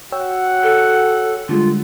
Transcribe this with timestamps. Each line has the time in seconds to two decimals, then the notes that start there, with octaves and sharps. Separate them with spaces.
0.12 F#4 C#5 F#5 G5 E6
0.63 A4
1.49 D3 G3 G#3 F4